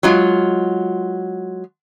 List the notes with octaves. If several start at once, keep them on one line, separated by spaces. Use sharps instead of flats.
F#3 G#3 F4